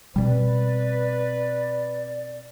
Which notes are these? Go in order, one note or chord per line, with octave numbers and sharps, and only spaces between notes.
B2 G3 C4 B4 D5